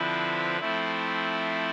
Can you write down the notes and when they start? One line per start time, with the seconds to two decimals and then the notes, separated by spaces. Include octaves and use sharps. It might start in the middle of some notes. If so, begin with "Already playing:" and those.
Already playing: D3 F3 C4 E4 B4
0.59 F3 A3 C4 E4